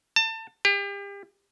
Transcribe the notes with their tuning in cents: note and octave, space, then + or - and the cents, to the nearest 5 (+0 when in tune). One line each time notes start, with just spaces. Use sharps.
A5 +30
G4 +35